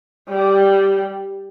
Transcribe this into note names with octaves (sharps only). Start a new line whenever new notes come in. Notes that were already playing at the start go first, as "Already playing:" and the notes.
G3